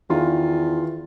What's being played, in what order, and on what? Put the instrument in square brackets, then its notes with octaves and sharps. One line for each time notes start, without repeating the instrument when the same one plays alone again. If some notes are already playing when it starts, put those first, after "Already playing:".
[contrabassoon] E2 [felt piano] D#3 F4